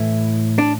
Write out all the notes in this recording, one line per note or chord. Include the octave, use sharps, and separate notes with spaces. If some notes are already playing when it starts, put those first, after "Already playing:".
Already playing: A2 E3 E4
D4